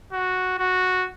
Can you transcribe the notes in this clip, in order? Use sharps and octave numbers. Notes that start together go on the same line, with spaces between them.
F#4
F#4